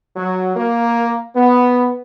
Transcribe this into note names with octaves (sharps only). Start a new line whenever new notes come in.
F#3
A#3
B3